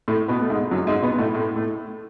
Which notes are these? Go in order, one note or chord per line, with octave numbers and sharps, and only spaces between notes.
A2 A3
B2 B3
A3
G#2 G#3
F#2 F#3
G#2 G#3
B2 B3
A2 A3
A2 A3
A2 A3